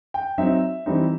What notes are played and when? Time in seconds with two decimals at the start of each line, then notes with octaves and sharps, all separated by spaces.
0.14 G5
0.38 F#3 C4 D#4 E5
0.86 E3 G3 C4 D#4